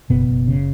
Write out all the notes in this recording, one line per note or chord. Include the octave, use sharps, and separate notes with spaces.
F#1 B2 B3
F#1
C#3